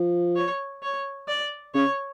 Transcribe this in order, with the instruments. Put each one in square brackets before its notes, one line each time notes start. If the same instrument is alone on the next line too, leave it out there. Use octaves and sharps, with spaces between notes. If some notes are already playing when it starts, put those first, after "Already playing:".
Already playing: [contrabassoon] F3
[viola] C#5
C#5
D5
[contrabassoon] C#3 [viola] C#5